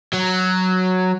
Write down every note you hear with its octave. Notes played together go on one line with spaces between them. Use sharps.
F#3